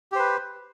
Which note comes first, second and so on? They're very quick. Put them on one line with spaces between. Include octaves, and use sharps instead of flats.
G4 C5 B4